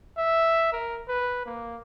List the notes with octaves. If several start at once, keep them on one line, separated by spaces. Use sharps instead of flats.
E5
A#4
B4
A#3